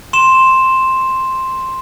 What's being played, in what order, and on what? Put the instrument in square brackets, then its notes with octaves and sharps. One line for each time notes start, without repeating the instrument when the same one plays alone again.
[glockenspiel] C6 E7